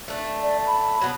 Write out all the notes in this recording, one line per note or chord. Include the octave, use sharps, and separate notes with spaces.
A3 D4
D5
B5
F#3 B3